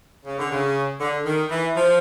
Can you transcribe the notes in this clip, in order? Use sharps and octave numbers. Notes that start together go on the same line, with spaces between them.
C#3
D3
C#3
D3
D#3
E3
F3